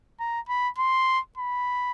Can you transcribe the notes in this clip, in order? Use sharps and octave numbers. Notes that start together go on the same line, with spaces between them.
A#5
B5
C6
B5